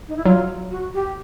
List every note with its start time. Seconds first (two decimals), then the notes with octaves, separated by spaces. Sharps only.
0.08 D#4
0.17 E4
0.25 F#3 F4
0.71 F#4
0.94 G4